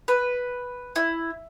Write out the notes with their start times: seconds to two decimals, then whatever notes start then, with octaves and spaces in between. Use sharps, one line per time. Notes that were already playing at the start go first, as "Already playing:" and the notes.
0.08 B4
0.96 E4